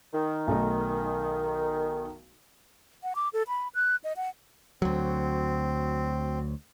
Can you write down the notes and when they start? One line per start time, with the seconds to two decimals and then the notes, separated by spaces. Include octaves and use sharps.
0.13 D#3
0.47 B1 A3 D#4
3.03 F#5
3.16 D6
3.33 A4
3.48 B5
3.75 F#6
4.04 D#5
4.17 F#5
4.82 D2 F#3 C4